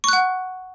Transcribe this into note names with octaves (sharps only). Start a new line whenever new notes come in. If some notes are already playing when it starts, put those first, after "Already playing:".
F#5 C#6 F#6